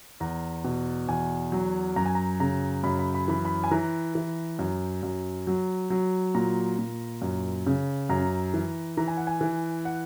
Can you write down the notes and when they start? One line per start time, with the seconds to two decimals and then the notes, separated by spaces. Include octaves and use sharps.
0.20 E2 A#5
0.64 B2
1.08 E2 G#5
1.52 F#3
1.96 F#2 A#5
2.06 G#5
2.15 A#5
2.40 C#3 A#5
2.83 F#2 B5
2.99 B5
3.14 B5
3.28 E3 B5
3.45 B5
3.64 G#5
3.71 E3 A#5
4.15 E3
4.59 F#2
5.03 F#2
5.47 F#3
5.90 F#3
6.35 A#2 A#5
6.78 A#2
7.22 F#2
7.66 C#3
8.10 F#2 A#5
8.54 E3
8.97 E3 A#5
9.08 G#5
9.17 F#5
9.27 G#5
9.41 E3
9.85 F#5